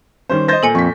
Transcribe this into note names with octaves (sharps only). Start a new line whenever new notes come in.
D#3 G3 C#4 C5
C5 D#5 G6 A6 A#6
A#2 A4 G#5 C#7
F2 C#6 B6